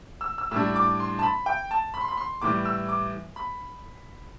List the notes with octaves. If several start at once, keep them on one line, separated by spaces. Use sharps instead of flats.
E6
E6
A2 G3 D4 E6
D6
C6
A5
B5
G5
A5
B5
C6
B5
C6
A2 E3 G3 D6
E6
D6
B5